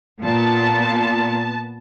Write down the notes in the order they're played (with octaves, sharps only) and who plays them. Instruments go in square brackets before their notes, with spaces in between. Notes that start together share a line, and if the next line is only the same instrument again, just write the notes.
[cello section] A#2 [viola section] B3 A5